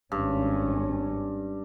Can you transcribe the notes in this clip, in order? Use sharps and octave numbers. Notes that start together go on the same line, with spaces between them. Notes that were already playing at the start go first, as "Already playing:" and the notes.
G#1 G2 C#4